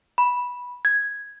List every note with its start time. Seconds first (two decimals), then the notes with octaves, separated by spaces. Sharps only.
0.18 B5
0.85 G#6